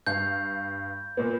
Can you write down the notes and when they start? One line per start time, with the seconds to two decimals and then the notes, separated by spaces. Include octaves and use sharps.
0.06 G2 F5 G6
1.17 A#2 A#3 B3